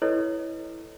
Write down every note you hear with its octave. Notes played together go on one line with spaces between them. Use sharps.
E4 A4 B4 C#5 D#5